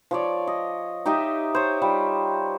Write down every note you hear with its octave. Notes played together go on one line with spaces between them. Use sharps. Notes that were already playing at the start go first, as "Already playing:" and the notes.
F3 C#5 D5
D#5
D#4 G4 D#5 E5
C5 C#5
G3 F4